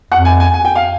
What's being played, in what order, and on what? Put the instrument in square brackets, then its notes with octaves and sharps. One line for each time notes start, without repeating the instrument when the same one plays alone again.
[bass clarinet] F2 [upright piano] F#5
[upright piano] G#5
G#5
G#5
G5
F5